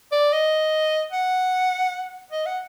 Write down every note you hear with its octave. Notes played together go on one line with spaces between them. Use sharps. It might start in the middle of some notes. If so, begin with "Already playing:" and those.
D5
D#5
F#5
D#5
F#5